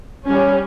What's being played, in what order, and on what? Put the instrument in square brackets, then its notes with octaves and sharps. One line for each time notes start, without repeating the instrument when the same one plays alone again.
[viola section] G3 C#4